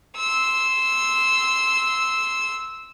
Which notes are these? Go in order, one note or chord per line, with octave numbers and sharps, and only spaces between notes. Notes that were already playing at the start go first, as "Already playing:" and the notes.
C6 E6